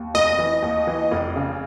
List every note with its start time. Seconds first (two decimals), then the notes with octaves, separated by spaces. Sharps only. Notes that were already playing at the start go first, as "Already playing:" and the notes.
Already playing: D#2
0.14 F1 D#5
0.38 E3
0.62 D#2
0.87 E3
1.11 F1
1.36 C#3